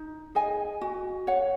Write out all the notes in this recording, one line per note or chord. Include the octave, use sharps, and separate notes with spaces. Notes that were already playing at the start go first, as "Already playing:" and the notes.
Already playing: D#4
G#4 D#5 G#5
F#4
C#5 F#5